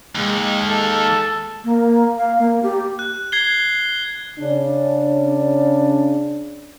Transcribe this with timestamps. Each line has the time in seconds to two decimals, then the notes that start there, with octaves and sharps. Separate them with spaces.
0.15 D#2 G#3
0.67 A4
1.64 A#3
2.17 F5
2.39 A#3
2.63 G4
2.99 F#6
3.32 G#6 C7 G7
4.39 C#3 C#4 D4